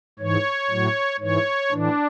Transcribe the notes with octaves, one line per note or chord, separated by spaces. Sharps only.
G#2 E3 C#5
A2 F#3
G#2 E3 C#5
A2 E3 D4